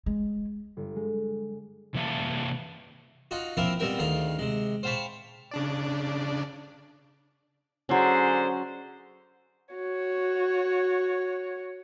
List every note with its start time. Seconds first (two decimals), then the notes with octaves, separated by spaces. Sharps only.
0.06 G#3
0.77 G1
0.96 G#3
1.94 C3 E3 A#3 E5 F5 A5
3.31 D#4 F4 F#4
3.57 F3 A#3 C4 E4 A#4 F5
3.79 B2 G3 C4 A#4 G5
3.99 D2 D#3 F4 G#4 F5
4.39 C3 G#3
4.83 C5 F5 G5 A5 B5 C#6
5.51 C#3 D4 D5
7.89 D3 F#3 C#4 G#4 C5
9.75 F#4 C#5